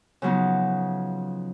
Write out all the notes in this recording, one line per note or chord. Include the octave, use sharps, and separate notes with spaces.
C#3 F3 F#3 B3 D#4